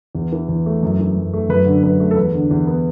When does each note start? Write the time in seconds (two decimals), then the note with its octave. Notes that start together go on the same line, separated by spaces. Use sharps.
0.15 E2
0.32 E3
0.48 E2
0.66 A3
0.83 F#2
0.99 E3
1.17 F#2
1.33 A3
1.49 F#2 B4
1.66 D3
1.83 F#2 B4
2.00 A3
2.11 A4
2.16 E2 B4
2.34 D3
2.51 E2
2.67 B3